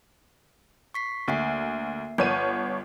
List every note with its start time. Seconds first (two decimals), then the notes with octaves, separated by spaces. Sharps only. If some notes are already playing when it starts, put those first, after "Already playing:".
0.94 C#6 B6 C7
1.28 D2 A#3 E5 C7
2.18 G1 C#5 F#5 G6 D#7